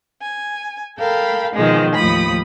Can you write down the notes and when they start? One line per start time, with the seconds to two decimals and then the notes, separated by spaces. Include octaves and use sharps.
0.22 G#5
0.98 A4 A#4 F5 G5 B5
1.54 B2 D#3 F3 G#3 C4
1.95 D#2 A2 F3 B5 D#6